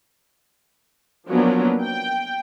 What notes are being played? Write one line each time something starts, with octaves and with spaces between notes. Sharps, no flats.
F3 F#3 A#3 B3 C#4 D4
G5